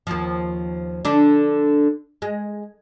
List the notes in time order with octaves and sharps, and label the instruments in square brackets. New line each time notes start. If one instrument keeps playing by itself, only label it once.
[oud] D#2 F3
D3 D4
G#3